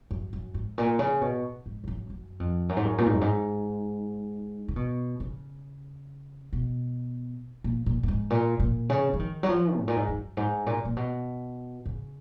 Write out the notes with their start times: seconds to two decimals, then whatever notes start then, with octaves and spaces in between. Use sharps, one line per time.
0.11 F#2
0.33 F#2
0.54 G#2
0.78 A#2
0.99 C#3
1.21 B2
1.66 G#2
1.84 F2
1.88 F#2
2.10 F#2
2.40 F2
2.69 F#2
2.77 G#2
2.85 F#2
2.98 A#2
3.06 G#2
3.14 F#2
3.21 G#2
4.68 C#3
4.76 B2
5.20 C#3
6.53 B2
7.64 A#2
7.86 A#2
8.03 A#2
8.08 G#2
8.30 A#2
8.60 A#2
8.90 C#3
9.14 F3
9.19 D#3
9.43 F#3
9.49 F3
9.78 G#2
9.88 A#2
9.96 G#2
10.08 F#2
10.37 G#2
10.66 A#2
10.85 A#2
10.97 B2
11.85 C#3